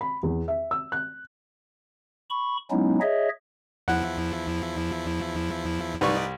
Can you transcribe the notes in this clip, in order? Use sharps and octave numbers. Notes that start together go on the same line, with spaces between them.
B5
E2
E5
E6
F#6
B5 C#6
F#3 G#3 B3 C#4 D#4 E4
G#4 C#5 D#5 E5
E2 F3 E4 F#5
C2 D#4 B4 D5 C#6